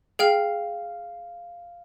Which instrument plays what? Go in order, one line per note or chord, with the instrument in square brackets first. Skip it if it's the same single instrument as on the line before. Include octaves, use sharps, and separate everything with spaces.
[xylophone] G#4 G5 F6 [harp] F5